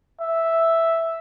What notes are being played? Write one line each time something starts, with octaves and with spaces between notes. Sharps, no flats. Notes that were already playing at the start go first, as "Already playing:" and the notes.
E5